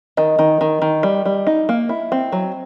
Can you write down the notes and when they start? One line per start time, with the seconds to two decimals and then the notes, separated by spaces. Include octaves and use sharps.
0.17 D#3 D#5
0.39 D#3
0.61 D#3
0.82 D#3
1.03 G3
1.25 G3
1.47 D#4
1.69 A#3
1.89 E4
2.12 C4
2.32 F#3